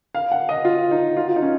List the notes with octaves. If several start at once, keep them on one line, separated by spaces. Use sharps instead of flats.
F5
F#5
D#5
F4
D#4
F4
F4
D#4
C#4